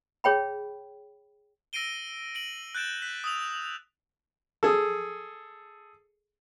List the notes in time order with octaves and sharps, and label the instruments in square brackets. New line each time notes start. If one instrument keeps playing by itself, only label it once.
[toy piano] G#4 C#5 G5 B5
[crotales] E6 A#6 C7 D7 D#7 G7
D7 F#7
F#6 G6 A6 D7 E7
F#6 B6
D#6 E6 F7
[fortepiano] G#4 A4